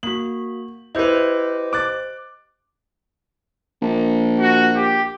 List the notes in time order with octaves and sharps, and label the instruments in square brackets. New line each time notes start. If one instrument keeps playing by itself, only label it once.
[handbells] A#3 F#4 [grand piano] F#7
[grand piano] E4 B4 [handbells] G4 C5 D#5
[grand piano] D6 F#6 A6
[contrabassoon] A#1
[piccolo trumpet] F#4
G4